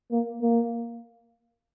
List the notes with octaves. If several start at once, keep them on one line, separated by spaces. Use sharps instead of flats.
A#3
A#3